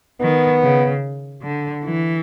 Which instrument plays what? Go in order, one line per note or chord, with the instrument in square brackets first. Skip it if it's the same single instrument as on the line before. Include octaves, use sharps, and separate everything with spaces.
[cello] D#3 [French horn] B3
[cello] C#3
D3
E3